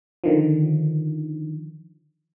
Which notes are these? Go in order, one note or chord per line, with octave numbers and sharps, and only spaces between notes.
D3 D#3 F3